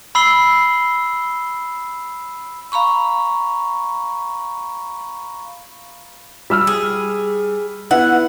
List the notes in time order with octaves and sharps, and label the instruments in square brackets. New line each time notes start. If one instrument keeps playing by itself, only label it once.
[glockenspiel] B5 E6 C7 G7
[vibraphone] F5 A#5 B5 C#6
[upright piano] G3 E6 F6
[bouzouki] G#4
[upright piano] B3 E4 [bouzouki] F#5